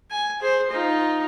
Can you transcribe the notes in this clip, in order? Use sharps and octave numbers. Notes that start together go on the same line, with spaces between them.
G#5
G#4 C5
D#4 F4